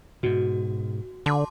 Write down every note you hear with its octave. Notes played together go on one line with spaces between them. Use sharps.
G#2 B2 F#4
D3 A5 C6 D6